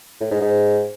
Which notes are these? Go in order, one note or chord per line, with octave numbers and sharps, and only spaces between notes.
A2
G#2
G#2